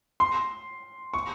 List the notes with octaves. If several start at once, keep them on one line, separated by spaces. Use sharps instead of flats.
C6
C#6